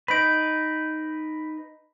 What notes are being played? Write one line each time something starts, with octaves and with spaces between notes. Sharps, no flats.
D#4 B4 B5 D7